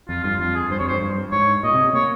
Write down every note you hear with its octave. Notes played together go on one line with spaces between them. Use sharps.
F2 F4
G2 F4
F2 F4
G#4
G2 C5
F2 C#5
G2 C5
G2
G#2 C#5
A#2 D#5
C3
C3
A#3 C#5